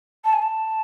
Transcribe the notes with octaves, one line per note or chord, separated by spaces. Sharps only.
A5
G#5
A5